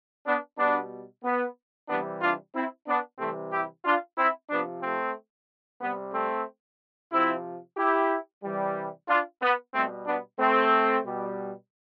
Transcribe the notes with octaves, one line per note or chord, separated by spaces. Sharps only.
B3 D4
B2 G3 B3 D4
B3
C3 E3 G3 B3 D4
D4 F4
C4 E4
B3 D4
C3 E3 G3 A3 C4
E4 G4
D4 F4
C4 E4
C3 F3 B3 D4
A3 C4
C3 G3 B3
A3 C4
C3 F3 C4 E4
E4 G4
C3 E3 G3
D4 F4
B3
B2 G3 A3 C4
B3 D4
A3 C4
B2 G3